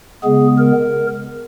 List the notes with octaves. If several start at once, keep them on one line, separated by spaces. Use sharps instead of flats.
C#3 G#3 B3 G#4
A#4